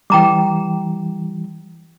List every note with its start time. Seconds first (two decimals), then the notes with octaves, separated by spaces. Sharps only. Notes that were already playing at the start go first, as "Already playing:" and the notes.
0.10 E3 G3 G5 A#5 D6